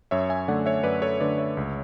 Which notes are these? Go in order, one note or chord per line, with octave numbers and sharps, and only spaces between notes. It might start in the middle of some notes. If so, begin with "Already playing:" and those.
F#2 C#5 E5
E5 G#5
D3 A3 D5 F#5
C#5 E5
F#2 B4 D5
A4 C#5
D3 A3 B4 D5
C#5 E5
C#2